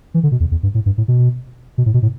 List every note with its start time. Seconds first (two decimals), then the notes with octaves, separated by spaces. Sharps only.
0.14 E3
0.23 D3
0.32 B2
0.40 E2
0.51 E2
0.63 G2
0.75 A2
0.86 G2
0.98 A2
1.08 B2
1.78 B2
1.86 A2
1.94 B2
2.02 A2